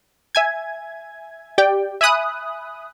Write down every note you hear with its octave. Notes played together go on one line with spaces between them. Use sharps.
E5 G#5 G#6
G4 D5 G5
E5 G#5 B5 D#6 F#6